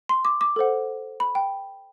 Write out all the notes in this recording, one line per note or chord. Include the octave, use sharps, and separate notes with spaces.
C6
D6
D6
A4 C5 F#5
B5
G5